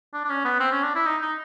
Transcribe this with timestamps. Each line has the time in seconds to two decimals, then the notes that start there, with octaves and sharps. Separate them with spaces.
0.14 D4
0.24 D4
0.30 C#4
0.45 B3
0.60 C4
0.72 C#4
0.83 D4
0.95 E4
1.06 D#4
1.22 D#4